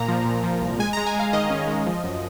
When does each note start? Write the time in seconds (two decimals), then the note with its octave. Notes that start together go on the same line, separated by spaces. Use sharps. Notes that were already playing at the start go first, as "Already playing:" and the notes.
Already playing: A#2 A#3 A#5
0.08 F3
0.25 A#2
0.44 F3
0.61 C2
0.79 G#3 G#5
0.93 G#3 A#5
1.07 G#5
1.14 G#3
1.19 F5
1.33 D#3 D#5
1.50 C#4
1.67 G#3
1.86 F3
2.04 F#2